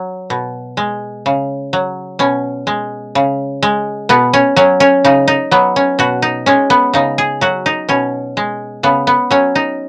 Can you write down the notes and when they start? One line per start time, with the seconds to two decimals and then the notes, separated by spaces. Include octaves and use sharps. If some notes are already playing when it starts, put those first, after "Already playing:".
Already playing: F#3
0.30 B2
0.77 G#3
1.26 C#3
1.73 F#3
2.19 B2 C#4
2.67 G#3
3.15 C#3
3.62 G#3
4.09 B2 B3
4.33 C#4
4.56 F#3 C#4
4.80 C#4
5.04 C#3 D#4
5.28 D#4
5.51 F#3 B3
5.76 C#4
5.99 B2 F#4
6.22 D#4
6.46 G#3 C#4
6.70 B3
6.93 C#3 D#4
7.18 G#4
7.41 F#3 F#4
7.66 D#4
7.89 B2 C#4
8.37 G#3
8.83 C#3 B3
9.07 B3
9.31 F#3 C#4
9.55 D#4